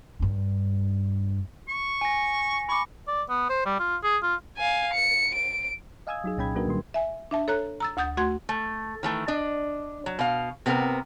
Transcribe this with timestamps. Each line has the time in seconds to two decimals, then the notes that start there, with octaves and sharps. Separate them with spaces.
0.20 G2 D4
1.68 C#6
2.01 G#5 A#6
2.69 B5 C#6 D6
3.08 D5
3.29 B3
3.50 C5
3.66 G3
3.80 F4
4.03 G#4
4.23 F4
4.58 F5 G#5
4.94 C#7
5.35 D7
6.07 D#5 F5 G#5 D#6 E6 G#6
6.24 F#3 D#4 G#4
6.37 C2 A#2 C#4 G5 B5 G#6
6.55 F#3 A#3 D4 F#4 A#4 B4
6.66 A#2 D#3 G3 C6
6.94 E5 G#5
7.31 D4 E5 A5
7.48 A4 C#5 A#5 F#6
7.80 A#5 E6 A6
7.97 D2 F#5 D#6 G6 A6
8.17 A3 F#4 F#5 C6 G#6
8.49 A3
9.03 D#3 E3 A3
9.28 D4 D#5
10.06 F#3
10.19 B2 F5
10.66 C3 B3 C4 F#4 A#4